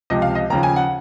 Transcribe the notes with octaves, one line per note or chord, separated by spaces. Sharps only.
C#2 C3 F3 D#5
F5
D#5
D#2 C#3 F3 A#5
G#5
F#5